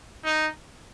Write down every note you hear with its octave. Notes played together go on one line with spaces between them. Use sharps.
D#4